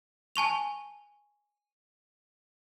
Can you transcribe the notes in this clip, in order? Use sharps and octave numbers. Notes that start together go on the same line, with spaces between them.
G#5 A5 C#6 F7